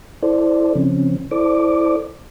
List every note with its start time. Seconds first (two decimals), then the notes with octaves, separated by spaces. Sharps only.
0.23 E4 A4 C5 D5
0.76 C#3 F3 C4 C#4
1.31 E4 A4 C5 D5 D6